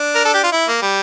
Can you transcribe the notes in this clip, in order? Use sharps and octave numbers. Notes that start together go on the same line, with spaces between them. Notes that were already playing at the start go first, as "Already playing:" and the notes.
Already playing: D4
A#4
A4
G4
F4
E4
A#3
G3